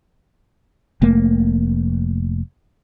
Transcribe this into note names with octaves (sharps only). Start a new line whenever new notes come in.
F1 A3 A#3